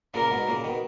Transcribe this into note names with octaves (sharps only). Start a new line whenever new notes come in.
A#2 C#3 A#4
G#2 B2
A#2 C#3
B2 D#3